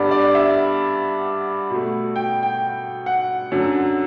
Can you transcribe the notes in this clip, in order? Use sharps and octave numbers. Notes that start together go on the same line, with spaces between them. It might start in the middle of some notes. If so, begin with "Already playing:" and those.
Already playing: G2 D3 G3 B3 D5
D5
E5
B2 A3
G5
G5
F#5
F#2 D3 F#3